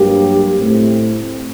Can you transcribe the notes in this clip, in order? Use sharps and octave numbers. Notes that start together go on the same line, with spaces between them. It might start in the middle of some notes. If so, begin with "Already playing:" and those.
Already playing: G2 F#3 A#3 G4
A2 A3 C4